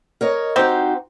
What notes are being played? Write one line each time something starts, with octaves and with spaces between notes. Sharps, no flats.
A#4 C#5 D#5
C4 D#4 F#4 G4 C5